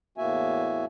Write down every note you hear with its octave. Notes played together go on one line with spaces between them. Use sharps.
E2 A2 A#3 F#4 E5 G#5